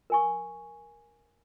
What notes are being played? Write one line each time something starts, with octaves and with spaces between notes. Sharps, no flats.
A#4 G#5 C#6